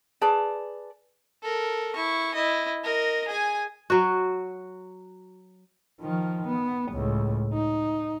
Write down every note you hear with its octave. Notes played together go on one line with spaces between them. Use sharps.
G#4 B4 D5 A5
A4 A#4
E4 C#6
E4 D#5
A#4 D#5
G#4 G#5
F#3 F#4
D#3 F3
B3
C#2 A2
D#4